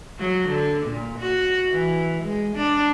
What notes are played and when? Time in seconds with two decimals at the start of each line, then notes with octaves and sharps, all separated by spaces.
0.19 F#3
0.49 D3
0.87 A#2
1.19 F#4
1.70 E3
2.23 G#3
2.55 D4